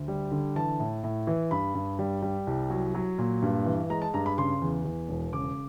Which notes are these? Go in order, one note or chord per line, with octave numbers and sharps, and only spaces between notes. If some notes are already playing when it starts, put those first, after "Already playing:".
Already playing: D2
G3
D3
E3 A5
A2
A2
E3
G2 B5
G2
G3
G3
C2
F#3
F#3
A#2
G2
E3
G#3 A#5
A5
G2 A#5
B5
C#3 C6
E2
E2
E1
C#3 D6